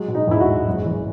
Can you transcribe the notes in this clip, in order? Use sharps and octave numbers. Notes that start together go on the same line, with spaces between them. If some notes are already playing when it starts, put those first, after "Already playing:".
Already playing: F#3 G#3
B2
D#4
E2 E4
F#4
G#3
F#1
E3